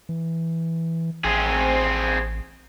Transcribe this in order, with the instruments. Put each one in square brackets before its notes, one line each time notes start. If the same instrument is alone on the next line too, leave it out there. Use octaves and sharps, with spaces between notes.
[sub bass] E3
[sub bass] A1 [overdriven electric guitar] C4 G#4